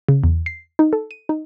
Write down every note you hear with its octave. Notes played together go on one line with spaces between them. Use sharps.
C#3
E2
C7
D#4
A4
D#7
D#4